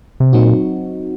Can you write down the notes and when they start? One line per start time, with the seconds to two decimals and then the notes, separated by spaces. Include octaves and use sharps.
0.20 C3
0.33 A#2 F#3 C4 D#4 F#4